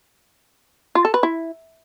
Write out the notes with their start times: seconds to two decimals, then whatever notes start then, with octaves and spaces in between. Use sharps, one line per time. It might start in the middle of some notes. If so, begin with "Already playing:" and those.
0.95 F4
1.05 A4
1.14 B4
1.23 E4